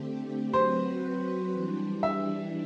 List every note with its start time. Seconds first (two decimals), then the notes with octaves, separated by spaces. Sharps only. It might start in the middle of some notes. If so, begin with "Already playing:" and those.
Already playing: D3 A3 C4 G4
0.53 F#3 C4 F#4 B4 C5
1.52 E3 G3 D4
2.03 E5